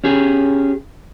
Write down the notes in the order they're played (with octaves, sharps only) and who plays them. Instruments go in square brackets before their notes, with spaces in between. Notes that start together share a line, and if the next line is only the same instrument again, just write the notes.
[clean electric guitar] C#4 G4 G#4